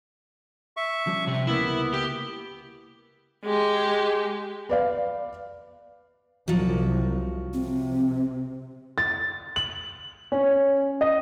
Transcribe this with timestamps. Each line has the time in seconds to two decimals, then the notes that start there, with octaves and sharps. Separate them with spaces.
0.77 E5 C#6
1.07 F3 G3 C#4
1.27 C3
1.47 C#2 A#3 B3 E4
1.93 G4
3.45 G#3 G4
4.69 B4 D5 F5
6.48 C2 F3 F#3
7.53 C3 C4
8.98 A6
9.56 F#7
10.32 C#4
11.01 D#5